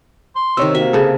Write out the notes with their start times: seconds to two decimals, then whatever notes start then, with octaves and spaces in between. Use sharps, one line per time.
0.35 C6
0.57 C3 D#3 C#5 E6
0.75 A#3 F#4 E5
0.93 C#3 A4